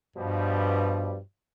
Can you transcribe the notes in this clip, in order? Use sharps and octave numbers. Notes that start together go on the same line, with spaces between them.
G2 B2 F3 G3